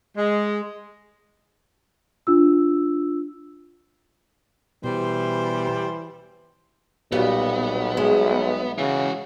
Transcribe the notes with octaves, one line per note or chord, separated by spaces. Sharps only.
G#3
D4 F4 E6
B2 E3 G3 C5
B1 A#2 G3 B3 F#4
G#3 E5
C#3 E3 F#4